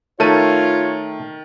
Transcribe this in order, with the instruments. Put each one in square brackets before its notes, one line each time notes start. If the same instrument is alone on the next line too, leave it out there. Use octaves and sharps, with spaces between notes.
[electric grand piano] D#3 A#4 D#7 [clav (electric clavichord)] A3 [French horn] F4 [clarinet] C#5